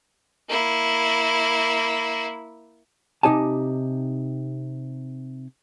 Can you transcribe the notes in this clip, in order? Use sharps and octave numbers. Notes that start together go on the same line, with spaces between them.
A#3 E4
C3 A#3 D#4 G4 G#5 A5